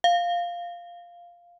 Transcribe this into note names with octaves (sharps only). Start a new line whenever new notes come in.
F5